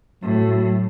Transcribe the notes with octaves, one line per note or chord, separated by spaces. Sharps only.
A2 F#3